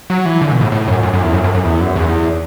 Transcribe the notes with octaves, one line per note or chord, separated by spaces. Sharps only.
F#3
E3
D3
B2
A2
A2
F#2
F#2
F#2
E2
F#2
F#2
F#2
E2
F#2
E2